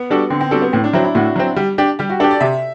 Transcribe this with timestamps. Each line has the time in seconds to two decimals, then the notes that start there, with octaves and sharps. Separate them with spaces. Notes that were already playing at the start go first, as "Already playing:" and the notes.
Already playing: B3
0.10 G3 D4 F#4 A4
0.30 D3 C4
0.41 C4
0.51 G3 C4 D4 F#4 A4
0.62 B3
0.73 A2 C4
0.84 D4
0.93 F#3 C4 E4
1.04 E4
1.15 A2 F#4
1.36 F#3 C4
1.56 G3
1.78 D4 G4
1.99 G3 G4
2.10 F#4
2.20 D4 G4 A4
2.31 D5
2.40 C3 E5